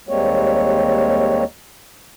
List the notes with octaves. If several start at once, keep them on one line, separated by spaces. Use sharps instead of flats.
D#2 G3 G#3 A#3 C4 C#5